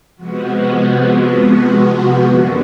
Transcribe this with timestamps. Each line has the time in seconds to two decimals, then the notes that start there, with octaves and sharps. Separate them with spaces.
0.16 C3 F3 G#3 B3 F#4
1.20 F#4
2.23 F#2 D3 G3 A#3 F#4